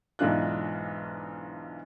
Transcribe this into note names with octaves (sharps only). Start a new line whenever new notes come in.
B1 G#2 E3 D4 F4 F#6